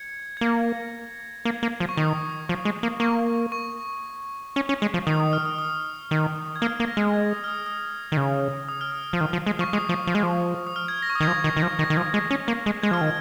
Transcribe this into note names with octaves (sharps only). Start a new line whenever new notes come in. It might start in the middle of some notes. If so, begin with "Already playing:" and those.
Already playing: G#6 C#7
G#6
A#3 A#6
A#3 G#6
A#3
F3
C#6
D#3 D#6
F3
G#3
A#3
A#3 C#6
C#6
C#4
C#4
G#3
F3
D#3 D#6
D#6
F6
D#6
D#6
D#3
G#6
A#3 F6
A#3
A#6
G#3
G#6
D#6
F6
D#6
D#6
D#3
C#3
D#6
F6
D#6
F3
D#3
F3
G#3
F3 C#6
G#3 D#6
F3
F3
G#3
F3
D#6
F6
G#6
A#6
C#6
D#6
D#3 G#6
F3 A#6
D#3
D#3
F3
D#3 A#6
D#3
F3
G#3
C#4
A#3
G#3
G#3 G#6
F3 F6
D#3 G#6